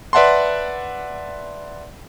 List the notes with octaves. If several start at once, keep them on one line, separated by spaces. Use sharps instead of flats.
B4 D5 E5 F#5 A5 C6